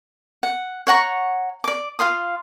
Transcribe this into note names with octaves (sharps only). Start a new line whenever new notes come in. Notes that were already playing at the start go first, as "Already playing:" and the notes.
F#5
C#5 F#5 A#5 C#6
D5 D6
F4 F5 C6 D#6